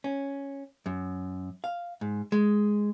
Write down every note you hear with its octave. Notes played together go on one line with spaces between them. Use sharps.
C#4
F#2
F5
G#2
G#3